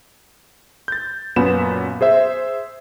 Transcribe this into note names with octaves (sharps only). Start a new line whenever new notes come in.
G6 A6
F#2 A#2 B3 B5 E7
G#4 C5 E5